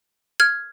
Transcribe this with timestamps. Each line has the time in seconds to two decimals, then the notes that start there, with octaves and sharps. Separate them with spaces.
0.40 F6 G#6